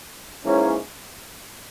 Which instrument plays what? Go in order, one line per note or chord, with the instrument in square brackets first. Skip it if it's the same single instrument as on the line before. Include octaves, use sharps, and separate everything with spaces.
[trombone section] G#2 E3 A#3 C#4